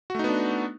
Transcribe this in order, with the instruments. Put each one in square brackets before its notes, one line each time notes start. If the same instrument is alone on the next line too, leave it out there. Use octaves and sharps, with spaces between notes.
[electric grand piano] F#4
A3
D#4
B3
D4